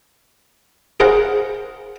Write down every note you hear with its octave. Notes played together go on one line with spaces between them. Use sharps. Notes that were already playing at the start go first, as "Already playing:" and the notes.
G#4 A#4 C5 F5 F#5